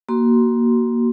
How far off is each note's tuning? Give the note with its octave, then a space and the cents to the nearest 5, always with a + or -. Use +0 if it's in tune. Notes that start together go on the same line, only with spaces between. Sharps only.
A#3 +15 F#4 +25 C6 +0